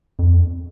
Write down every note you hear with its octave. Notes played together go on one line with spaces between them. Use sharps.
F2